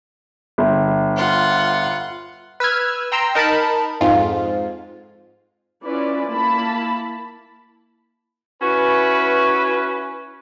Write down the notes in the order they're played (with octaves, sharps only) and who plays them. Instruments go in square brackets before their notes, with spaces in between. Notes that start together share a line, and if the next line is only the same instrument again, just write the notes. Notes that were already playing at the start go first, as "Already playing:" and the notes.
[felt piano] G1
[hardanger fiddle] F4 F#5
[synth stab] B4 E6 F6 G#6
G5 A#5 C6 E6
D#4 A#4 A5 B5
F2 G#2 F4
[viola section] C#4 E4 F4 B4 D5
A#3 E4 A5 B5
[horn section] C#4 E4 F#4 B4